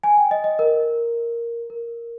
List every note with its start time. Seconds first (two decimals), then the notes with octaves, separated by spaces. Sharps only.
0.04 G#5
0.17 G5
0.31 D#5
0.44 D#5
0.59 A#4
1.70 A#4